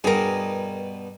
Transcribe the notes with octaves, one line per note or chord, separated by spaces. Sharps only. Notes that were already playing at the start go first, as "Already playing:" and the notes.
G2 B2 G#4 A#4